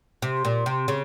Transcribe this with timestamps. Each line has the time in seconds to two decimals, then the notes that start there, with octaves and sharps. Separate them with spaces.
0.22 C3
0.45 A#2
0.66 C3
0.88 C#3